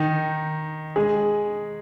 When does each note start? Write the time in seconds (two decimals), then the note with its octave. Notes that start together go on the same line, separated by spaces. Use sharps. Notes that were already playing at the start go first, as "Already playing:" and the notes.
Already playing: D#3 D#4
0.96 G#3 G#4